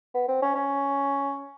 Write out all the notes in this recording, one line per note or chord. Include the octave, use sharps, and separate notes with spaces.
B3
C4
C#4
C#4